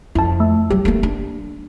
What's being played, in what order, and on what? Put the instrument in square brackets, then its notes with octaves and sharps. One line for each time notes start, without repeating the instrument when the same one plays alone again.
[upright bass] F2 [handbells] E4 A5
[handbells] A3 E6
[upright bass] F#3 [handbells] G4
[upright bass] A3 A#3
D4